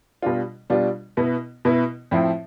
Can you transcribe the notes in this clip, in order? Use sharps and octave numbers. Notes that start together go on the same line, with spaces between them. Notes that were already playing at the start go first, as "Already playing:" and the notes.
B2 G3 D4 F4
B2 G3 D4 F4
B2 B3 E4
B2 B3 E4
A2 F3 C4 E4